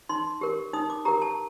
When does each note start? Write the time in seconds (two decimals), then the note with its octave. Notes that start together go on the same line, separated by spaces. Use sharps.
0.09 D#4 C6
0.41 G4 A#4
0.74 D#4 D#6
0.90 D6
1.05 G4 A#4 A#5
1.22 A5